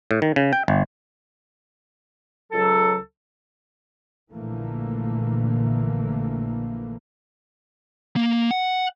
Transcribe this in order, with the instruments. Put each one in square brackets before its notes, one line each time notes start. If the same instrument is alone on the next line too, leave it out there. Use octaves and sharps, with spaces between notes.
[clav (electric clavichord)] A2
D#3
C#3
G5
G1
[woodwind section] C#2 F#3 A4
[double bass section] A#1 A#2 D3 E3 A3 A#3
[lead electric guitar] A#3
F#5